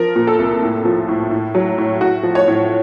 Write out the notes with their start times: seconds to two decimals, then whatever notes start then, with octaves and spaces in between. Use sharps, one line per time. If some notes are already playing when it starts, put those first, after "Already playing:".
Already playing: F3 A#4
0.16 A#2
0.27 A4
0.39 C2
0.62 A2
0.85 F3
1.08 A2
1.31 A2
1.55 F#3
1.78 A2
2.00 A2 F#4
2.23 F3
2.35 C#5
2.48 A2